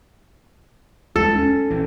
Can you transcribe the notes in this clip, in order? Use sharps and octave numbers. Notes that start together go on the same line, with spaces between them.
D#2 G#3 A4
C#4 D4
A#1 E3